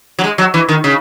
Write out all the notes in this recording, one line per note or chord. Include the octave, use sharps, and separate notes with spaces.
F#3
G#3
F#3
E3
D#3
C#3